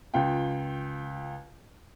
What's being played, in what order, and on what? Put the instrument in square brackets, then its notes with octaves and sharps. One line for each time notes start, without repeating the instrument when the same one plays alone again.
[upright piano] C#2 F4 G5